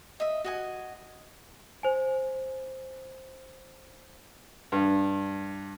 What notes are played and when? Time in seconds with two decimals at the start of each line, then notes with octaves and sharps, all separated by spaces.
0.20 D#5 E5
0.44 F#4 D#5 G#5
1.83 C5 G#5
4.72 G2